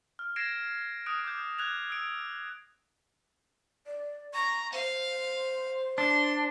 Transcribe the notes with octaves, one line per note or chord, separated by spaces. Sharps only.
F6
G#6 A#6 C7 D7 E7
D#6 F#6 D7
D6 F6 G6
F#6 G#6 F7
E6 D7
D5
A#5 C#6
C5 F5
D4 C6